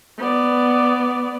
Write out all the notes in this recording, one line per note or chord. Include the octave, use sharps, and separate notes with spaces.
B3 D5